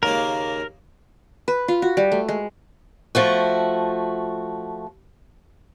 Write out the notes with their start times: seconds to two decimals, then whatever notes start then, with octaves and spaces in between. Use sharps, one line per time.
0.03 D#2 C#3 A#3 A#4
1.48 B4
1.68 F4
1.82 F#4
1.97 G3
2.12 A3
2.29 G#3
3.15 F3 A3 F#4